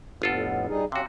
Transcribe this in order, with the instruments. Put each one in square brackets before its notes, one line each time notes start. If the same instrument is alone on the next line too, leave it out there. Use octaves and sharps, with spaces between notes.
[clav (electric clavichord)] G1 F4 A4 [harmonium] F2 A2 B3
[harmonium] G3 D#4 G#4
[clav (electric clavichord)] C3 F#4 [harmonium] C#4 G4 F5